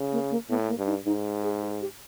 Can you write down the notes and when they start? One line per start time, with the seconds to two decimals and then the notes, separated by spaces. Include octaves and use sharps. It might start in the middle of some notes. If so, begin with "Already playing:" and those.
Already playing: C#3
0.12 A#3
0.31 A#3
0.50 A2 B3
0.68 A#3
0.78 G2
0.87 D#4
1.06 G#2 D#4
1.43 G#4
1.62 G#4
1.81 G4